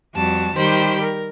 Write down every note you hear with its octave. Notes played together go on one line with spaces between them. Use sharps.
F2 G3 F#4 A5
D#3 G3 G4 C5 B5 G6
A#4